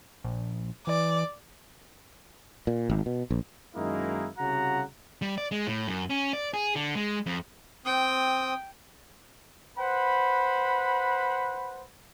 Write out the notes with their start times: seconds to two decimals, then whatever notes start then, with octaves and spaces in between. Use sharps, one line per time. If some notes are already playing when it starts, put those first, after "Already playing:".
0.24 A#1
0.87 E3 D5
2.67 A#2
2.90 G#1
3.06 B2
3.30 A#1
3.75 F#2 D#3 G#3 A#3 D#4 E4
4.38 C2 C#3 F#4 F#5 A#5
5.22 G3
5.38 D5
5.51 G#3
5.67 A2
5.88 F#2
6.10 C#4
6.33 D5
6.54 G#4
6.76 D3
6.96 G#3
7.26 F2
7.85 C4 G5 D#6
9.78 B4 C5 F#5 B5